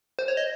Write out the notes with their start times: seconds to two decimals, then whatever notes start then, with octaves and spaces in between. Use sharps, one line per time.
0.19 C5
0.28 C#5
0.37 D#5